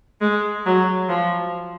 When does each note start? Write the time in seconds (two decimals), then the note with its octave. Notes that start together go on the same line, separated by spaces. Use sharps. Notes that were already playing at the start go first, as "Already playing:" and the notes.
0.21 G#3
0.66 F#3
1.09 F3